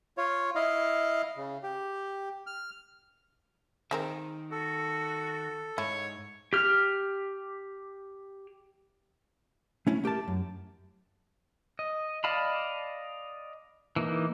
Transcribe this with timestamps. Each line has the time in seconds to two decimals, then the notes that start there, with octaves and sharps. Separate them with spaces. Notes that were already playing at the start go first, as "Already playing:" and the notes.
0.18 F4 C#5
0.55 E4 D#5 F5
1.37 C#3
1.63 G4
2.47 F6
3.91 D#3 G#3 C4 A#4
4.51 F#4 A4
5.78 G#2 E4 C#5
6.53 G4 F6
9.87 A3 C#4 E4
10.03 A3 G4 A#4 A5
10.28 F#2
11.79 D#5
12.24 D5 D#5 F5 A5 B5
13.96 E3 A#3 D#4